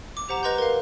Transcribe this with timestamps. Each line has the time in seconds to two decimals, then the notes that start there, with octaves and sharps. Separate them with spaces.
0.17 D6
0.29 G4 C5 F#5 A#5 E7
0.43 B4 D#5 A#5 C6 D6 G6
0.58 A#4 F5